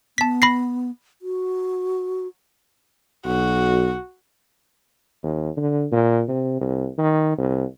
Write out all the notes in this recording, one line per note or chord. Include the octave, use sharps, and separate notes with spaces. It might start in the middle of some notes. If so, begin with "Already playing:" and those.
B3 A5 B6
B5 A#6 C7
F#4
B1 F#4
D#2
D3
A#2
C3
C2
D#3
C2